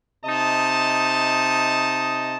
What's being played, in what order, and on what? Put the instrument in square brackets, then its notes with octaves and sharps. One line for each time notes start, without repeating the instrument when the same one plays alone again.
[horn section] C3 D#4 D#5 A5